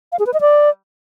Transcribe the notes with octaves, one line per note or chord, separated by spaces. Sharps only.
F5
G#4
B4
D#5
D5